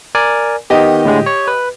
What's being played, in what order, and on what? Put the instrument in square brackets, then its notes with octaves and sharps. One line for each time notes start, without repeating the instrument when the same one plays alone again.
[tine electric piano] A#4 D5 G#5
[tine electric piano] D#3 B3 [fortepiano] G4 D#5
[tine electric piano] A2 D3 G#3
C#5
B4